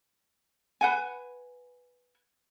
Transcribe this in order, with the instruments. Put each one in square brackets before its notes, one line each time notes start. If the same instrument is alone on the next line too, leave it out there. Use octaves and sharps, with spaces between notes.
[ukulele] B4 F#5 G#5